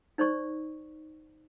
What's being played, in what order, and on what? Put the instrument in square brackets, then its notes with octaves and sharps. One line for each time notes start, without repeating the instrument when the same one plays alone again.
[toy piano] D#4 C5 D5 C#6